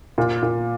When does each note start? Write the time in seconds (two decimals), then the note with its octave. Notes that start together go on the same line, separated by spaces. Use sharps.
0.18 A#2
0.43 A#2